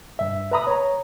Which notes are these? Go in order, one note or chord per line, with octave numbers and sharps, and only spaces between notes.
G2 E5
B4 E5 A#5 B5 D#6
C#5 A#5